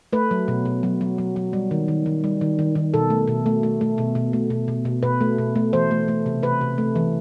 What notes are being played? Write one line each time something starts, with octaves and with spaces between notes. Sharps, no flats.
A3 B4
F#3
B2
B2
F#3
F#3
F#3
F#3
G3
D#3
D#3
D#3
G3
D#3
D#3
D#3
B2 A4
A3
B2
A3
A3
A3
B2
B2
A3
B2
B2
B2
B2 B4
A3
B2
A3
E3 C5
A3
A3
C3
C3 B4
C3
A3
E3